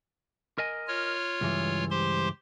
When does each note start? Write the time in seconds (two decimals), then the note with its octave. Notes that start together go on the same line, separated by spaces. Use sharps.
0.58 A#4 D#5 G#5
0.88 F4 C#5 F6
1.41 C#2 G2 E3
1.91 G4 C5 C6